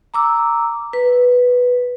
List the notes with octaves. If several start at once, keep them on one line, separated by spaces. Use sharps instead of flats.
A#5 D6 E6
B4